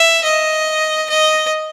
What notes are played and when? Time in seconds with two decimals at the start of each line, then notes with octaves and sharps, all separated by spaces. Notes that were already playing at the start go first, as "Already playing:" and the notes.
Already playing: E5
0.24 D#5
1.10 D#5